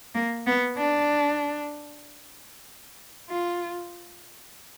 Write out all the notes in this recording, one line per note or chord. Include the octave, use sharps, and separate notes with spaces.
A#3
B3
D4
F4